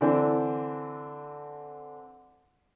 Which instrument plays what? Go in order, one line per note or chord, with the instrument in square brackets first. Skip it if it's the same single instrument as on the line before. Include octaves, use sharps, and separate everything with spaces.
[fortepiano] D3 E3 C4 D4